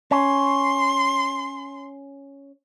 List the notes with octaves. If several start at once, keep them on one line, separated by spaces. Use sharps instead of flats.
C#4 C6